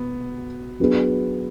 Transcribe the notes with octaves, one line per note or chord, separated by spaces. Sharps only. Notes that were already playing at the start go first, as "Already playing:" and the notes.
Already playing: B2 B3
F#3 B3 D4 G#4 B4